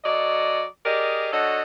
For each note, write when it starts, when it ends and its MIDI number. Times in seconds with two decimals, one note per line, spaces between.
0.04 0.64 54
0.04 0.64 69
0.04 0.64 74
0.04 0.64 75
0.86 1.32 67
0.86 1.32 68
0.86 1.32 70
0.86 1.32 74
0.86 1.32 75
1.33 1.62 50
1.33 1.62 66
1.33 1.62 69
1.33 1.62 73
1.33 1.62 75